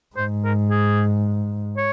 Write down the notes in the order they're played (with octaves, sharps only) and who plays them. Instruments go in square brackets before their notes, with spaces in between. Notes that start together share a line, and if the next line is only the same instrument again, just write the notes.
[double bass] G#2 [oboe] C5
[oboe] A#4
G#4
C#5